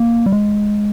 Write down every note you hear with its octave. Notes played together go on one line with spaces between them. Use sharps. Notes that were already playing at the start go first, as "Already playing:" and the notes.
Already playing: A#3
G3
G#3